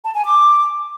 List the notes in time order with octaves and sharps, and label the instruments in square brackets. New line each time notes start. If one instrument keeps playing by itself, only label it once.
[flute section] A5
G#5
D6